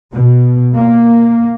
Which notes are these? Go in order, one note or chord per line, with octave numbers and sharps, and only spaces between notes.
B2
A#3